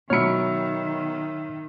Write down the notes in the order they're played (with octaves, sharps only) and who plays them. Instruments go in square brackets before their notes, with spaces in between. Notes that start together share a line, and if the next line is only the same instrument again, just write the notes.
[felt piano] B2 F#3 C#7 [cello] D#3 [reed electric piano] C#5 B5 [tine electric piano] E5 F6